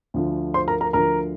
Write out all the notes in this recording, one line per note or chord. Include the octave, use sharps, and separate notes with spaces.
D2 D3 F3
C5 C6
A#4 A#5
A#4 A#5
D2 D3 F3 A#4 A#5